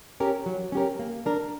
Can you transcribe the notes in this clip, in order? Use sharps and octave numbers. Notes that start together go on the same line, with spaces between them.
C#4 G4 A#4
F#3
C#4 G4 A#4
A#3
D4 A#4